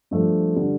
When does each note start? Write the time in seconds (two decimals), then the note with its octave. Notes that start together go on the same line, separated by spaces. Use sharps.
0.11 G2 F3 A3
0.56 D3 G3